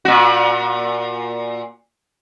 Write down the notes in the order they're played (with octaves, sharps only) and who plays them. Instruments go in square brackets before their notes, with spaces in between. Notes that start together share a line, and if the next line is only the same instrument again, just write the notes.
[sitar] A#2 F#4